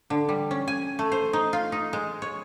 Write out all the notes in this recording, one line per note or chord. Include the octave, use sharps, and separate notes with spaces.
D3
G3
C#4
G#5
A3
C5
D#4
F4
D#4
G#3
C#5